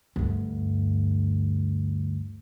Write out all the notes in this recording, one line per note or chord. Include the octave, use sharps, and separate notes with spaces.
D2 G2